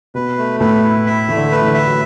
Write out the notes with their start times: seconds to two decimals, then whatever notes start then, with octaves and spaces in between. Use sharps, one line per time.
0.15 B2 B4
0.38 A3
0.60 A2 B4
0.83 E4
1.06 E5
1.28 E3 A3
1.37 D3
1.52 B4
1.62 E3
1.67 D3
1.74 E5
1.87 F#3